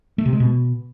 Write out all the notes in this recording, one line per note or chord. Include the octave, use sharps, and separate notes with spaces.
A3
C3
G#3
B2